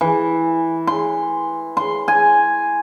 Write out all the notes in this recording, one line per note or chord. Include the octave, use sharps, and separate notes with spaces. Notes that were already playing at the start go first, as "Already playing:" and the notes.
E3
C6
C6
G#5